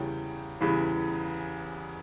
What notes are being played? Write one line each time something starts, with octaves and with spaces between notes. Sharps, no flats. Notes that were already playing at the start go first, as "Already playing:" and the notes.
Already playing: E2 C#3 E3 G3 G5
E2 C#3 E3 G3 B5